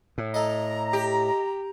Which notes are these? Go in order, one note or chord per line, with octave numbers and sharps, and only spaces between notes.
A2
A4 D#5 A#5
G4